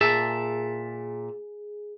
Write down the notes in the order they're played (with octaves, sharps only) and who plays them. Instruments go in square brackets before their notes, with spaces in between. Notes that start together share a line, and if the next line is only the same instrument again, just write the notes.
[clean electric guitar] A#2 E5 A5 [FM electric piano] G#4